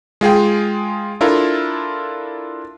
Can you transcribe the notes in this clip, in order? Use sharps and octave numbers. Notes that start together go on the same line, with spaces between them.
G#3 F4 G#4 G5
D4 E4 F4 A4 A#4